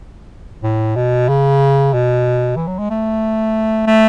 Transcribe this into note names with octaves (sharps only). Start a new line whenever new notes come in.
A2
B2
C#3
B2
E3
F#3
G#3
A3
A3